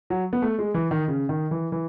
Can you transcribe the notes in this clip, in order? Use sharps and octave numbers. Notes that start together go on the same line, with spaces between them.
F#3
B3
A3
G#3
E3
D#3
C#3
D#3
E3
E3